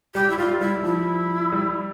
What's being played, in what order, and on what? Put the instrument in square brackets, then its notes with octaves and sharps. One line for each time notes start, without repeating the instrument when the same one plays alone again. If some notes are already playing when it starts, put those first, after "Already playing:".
[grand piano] G3 [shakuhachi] G4
[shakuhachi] E4
[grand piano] G3 [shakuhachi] F4
[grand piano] G3 [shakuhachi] E4
[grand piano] F3 [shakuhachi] E4
[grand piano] G3